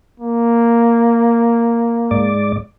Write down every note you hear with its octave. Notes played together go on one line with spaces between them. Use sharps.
A#3
G#2 D5